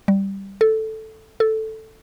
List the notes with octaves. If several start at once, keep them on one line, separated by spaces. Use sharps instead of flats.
G3
A4
A4